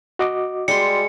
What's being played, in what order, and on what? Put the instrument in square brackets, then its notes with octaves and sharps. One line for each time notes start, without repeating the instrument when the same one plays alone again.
[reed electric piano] F#4 D#5 D6
[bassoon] G3 [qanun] G#3 C6 [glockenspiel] C#7